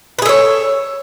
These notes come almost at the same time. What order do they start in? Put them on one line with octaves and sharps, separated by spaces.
B4 G#4 A4 C#5